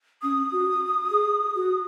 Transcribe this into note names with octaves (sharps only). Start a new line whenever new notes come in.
C#4 D#6
F#4
G#4
F#4